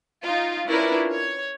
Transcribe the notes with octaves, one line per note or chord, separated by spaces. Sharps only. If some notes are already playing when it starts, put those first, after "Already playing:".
D#4 F4
C#4 D4 E4 F4 A#4 B4
C#5